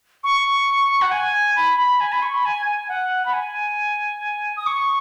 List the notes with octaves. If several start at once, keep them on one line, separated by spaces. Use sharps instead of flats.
C#6
F#5
G#5
B5
B5
G#5
B5
C#6
B5
G#5
G#5
F#5
B5
G#5
D#6
C#6